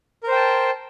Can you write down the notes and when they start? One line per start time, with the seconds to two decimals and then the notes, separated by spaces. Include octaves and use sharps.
0.23 A#4
0.28 C5
0.32 G5
0.36 A5